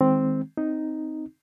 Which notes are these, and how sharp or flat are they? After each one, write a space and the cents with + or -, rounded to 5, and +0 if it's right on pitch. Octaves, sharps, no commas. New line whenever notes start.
D#3 +25 G#3 -5 C4 +0
C4 -5 D#4 +0